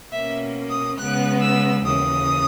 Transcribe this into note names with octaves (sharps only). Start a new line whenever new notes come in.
B2 A#3 C#4 E5
D#6
C#3 G#3 B3 F#6
E6
D#2 C#3 E3 D#6